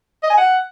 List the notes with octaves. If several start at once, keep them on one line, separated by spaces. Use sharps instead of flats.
D#5
G#5
F#5